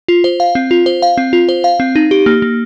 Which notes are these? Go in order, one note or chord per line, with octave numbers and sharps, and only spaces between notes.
F4
C5
F5
C4
F4
C5
F5
C4
F4
C5
F5
C4
D#4
G4
A#3
A#3